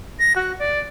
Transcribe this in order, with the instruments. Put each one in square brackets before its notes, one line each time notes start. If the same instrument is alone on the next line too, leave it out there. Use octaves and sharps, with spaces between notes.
[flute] A#6
F#4
D5